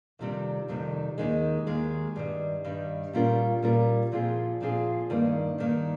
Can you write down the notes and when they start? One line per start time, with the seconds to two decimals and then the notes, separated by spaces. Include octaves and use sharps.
0.19 F2 C3 D#3 G3 C4
0.68 F2 C3 D#3 G3 C4
1.18 D#2 D#3 G#3
1.67 D#2 D#3 G#3
2.16 G2 D#3 G3
2.65 G2 D#3 G3
3.13 A#2 G3 C#4 F4 A#4
3.62 A#2 G3 C#4 F4 A#4
4.12 A#2 F3 C4 F4 G#4
4.61 A#2 F3 C4 F4 G#4
5.10 G2 D#3 A#3
5.58 G2 D#3 A#3